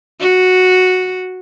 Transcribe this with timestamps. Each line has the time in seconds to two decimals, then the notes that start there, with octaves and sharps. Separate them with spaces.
0.20 F#4